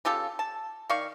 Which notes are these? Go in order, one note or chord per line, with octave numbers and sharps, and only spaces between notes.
C#3 F4 G4 A4
A5
D#3 D5 F5 C#6